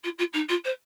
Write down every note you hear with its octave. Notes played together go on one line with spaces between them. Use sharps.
F4
F4
D#4
F4
C5